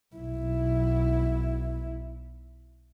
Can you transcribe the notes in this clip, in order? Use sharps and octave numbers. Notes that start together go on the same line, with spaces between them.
B1 E4